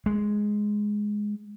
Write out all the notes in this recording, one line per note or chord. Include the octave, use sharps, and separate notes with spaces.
G#3